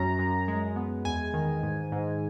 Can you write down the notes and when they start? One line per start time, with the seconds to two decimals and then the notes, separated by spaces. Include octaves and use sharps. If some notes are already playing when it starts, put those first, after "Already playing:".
Already playing: F#2 C#4 A#5
0.19 F#2
0.48 G#3
0.76 B3
1.05 E2 G#5
1.34 D#3
1.63 G#2
1.92 G#2